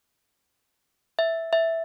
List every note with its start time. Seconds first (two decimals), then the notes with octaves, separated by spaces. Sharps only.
1.19 E5
1.53 E5